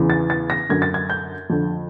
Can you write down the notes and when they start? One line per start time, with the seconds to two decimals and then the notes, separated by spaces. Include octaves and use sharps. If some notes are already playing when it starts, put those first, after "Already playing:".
Already playing: E2 C#3 E3
0.10 A6
0.30 A6
0.50 A#6
0.69 F#2 D3 G#6
0.82 A6
0.94 G#6
1.10 G6
1.50 F2 D3